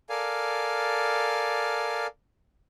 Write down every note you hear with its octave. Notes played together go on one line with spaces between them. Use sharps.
A4 A#4 D5 F5 G#5